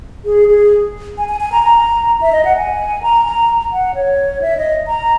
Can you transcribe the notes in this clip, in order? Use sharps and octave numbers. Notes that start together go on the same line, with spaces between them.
G#4
G#4
G#5
G#5
G#5
A#5
A#5
E5
D#5
F#5
G#5
A#5
A#5
F#5
C#5
E5
D#5
A#5